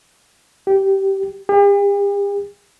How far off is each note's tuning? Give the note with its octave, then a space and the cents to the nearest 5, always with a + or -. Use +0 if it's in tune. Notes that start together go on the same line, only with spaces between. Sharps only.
G4 -15
G4 +45